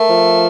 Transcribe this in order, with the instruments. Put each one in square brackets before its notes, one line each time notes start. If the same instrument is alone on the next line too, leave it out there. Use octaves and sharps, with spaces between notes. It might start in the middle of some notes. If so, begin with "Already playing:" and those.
Already playing: [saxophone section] A3 [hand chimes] A#4
[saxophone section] F3